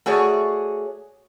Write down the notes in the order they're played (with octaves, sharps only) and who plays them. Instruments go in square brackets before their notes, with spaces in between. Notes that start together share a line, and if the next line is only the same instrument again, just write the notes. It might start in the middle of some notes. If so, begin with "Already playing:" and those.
[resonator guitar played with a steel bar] A3 F#4 G#4 C#5 D5